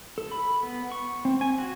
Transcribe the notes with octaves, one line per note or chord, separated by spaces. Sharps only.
A4
B5
B3
C#6
C4
G#5
F#4